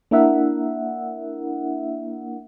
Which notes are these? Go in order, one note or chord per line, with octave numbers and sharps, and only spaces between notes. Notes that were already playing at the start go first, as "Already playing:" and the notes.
A#3 D4 E4 A#4 E5 F#5